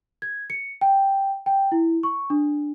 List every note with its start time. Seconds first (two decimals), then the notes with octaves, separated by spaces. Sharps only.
0.22 G#6
0.50 C#7
0.81 G5
1.46 G5
1.72 E4
2.03 C#6
2.30 D4